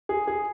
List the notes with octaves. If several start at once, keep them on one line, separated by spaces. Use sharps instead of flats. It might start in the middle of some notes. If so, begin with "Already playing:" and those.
G#4
G#4